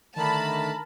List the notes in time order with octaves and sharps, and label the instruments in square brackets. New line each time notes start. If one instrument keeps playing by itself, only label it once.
[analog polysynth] D3 D#3 [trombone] A3 [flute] A#4 [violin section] A5 B5